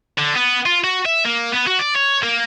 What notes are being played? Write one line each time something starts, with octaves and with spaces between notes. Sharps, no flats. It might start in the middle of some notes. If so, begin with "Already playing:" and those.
D3
B3
F4
F#4
E5
A#3
B3
F#4
D5
C#5
A#3